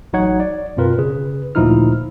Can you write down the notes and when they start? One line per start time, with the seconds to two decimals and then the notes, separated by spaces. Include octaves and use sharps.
0.13 A1 F#3 D#4 C#5 F#5 G#6
0.40 D5
0.77 F#2 B2 C4 F4 A#4 B4
0.98 C#3 G#4 B4
1.55 D2 A#2 F3 D#4 E4 F6